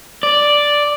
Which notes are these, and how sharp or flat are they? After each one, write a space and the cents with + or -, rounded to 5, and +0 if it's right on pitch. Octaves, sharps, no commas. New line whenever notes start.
D5 +0